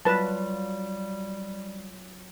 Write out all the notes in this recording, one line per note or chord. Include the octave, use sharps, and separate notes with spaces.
F#3 G3 F4 B4 A5